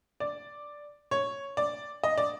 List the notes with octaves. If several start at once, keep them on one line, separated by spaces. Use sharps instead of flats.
D5
C#5
D5
D#5
D5